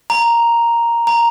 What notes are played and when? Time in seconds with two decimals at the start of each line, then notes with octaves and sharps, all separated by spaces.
0.10 A#5
1.07 A#5